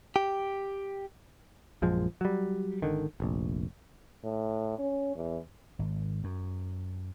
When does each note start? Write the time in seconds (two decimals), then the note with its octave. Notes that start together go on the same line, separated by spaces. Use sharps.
0.16 G4
1.82 A#1 F#2 F3 G#3
2.21 F#3 G3
2.82 G#1 D3 D#3
3.20 F1 A#1
4.24 A2
4.79 C#4
5.16 E2
5.79 G#1
6.24 F#2